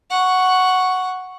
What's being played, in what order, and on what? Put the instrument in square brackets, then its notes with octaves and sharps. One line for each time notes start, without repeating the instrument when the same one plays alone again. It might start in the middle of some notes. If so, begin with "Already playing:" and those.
[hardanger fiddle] F#5 C#6